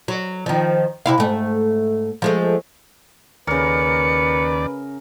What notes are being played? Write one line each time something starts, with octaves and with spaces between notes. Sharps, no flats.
F#3
D#3 F3
C3 E4 F5
G#2 A3
F3 G#3 A3
D#2 C#3 A#4 B4 D5 C#7